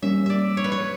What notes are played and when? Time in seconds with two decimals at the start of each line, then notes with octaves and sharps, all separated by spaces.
0.02 G3 A#3 C#4 E5
0.26 D5 E5
0.57 C#5
0.64 B4
0.72 C#5